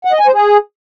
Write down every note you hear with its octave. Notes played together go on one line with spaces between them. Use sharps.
F#5
D#5
G#5
C5
G#4